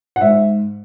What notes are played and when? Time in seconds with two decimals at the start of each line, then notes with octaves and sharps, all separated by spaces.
0.16 F#5
0.21 G#2 E5